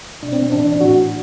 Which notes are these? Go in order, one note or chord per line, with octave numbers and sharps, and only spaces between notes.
B2 D4
C4
C4
A2 E3 D4
D4
A2 E3 F#4